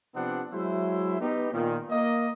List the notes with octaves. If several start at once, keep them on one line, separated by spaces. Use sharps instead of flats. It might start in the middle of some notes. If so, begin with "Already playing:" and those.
C3 F3 B3 C4 D4 F#5
F#3 G#3 E4 C5 E5
B3 D#4 G4
A#2 D#3
A#3 D#5